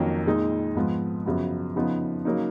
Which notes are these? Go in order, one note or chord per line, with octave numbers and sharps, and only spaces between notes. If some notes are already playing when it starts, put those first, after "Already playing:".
Already playing: F2 D#3 F#3 A#3 C#4
A#2 G#3 D#4
G#2 F3 B3
F#2 C#3 F3 B3
C#3 F3 B3 D#4
C#3 F#3 A#3 D#4